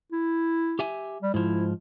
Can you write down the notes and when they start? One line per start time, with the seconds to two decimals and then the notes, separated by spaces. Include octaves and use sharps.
0.12 E4
0.79 G4 E5 G#5
1.23 G3
1.34 G#2 F3 E4